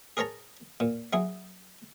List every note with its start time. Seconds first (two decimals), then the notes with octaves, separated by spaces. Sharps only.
0.17 G#4 A#4 C#5 A5 A#5
0.80 A#2
1.13 F#3 E4 G#4